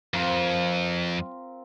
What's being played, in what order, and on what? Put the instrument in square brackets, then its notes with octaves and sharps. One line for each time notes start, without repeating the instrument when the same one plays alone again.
[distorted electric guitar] F2 [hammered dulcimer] C4 F4 A#4